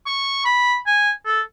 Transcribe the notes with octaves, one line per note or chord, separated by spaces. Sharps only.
C#6
B5
G#5
A4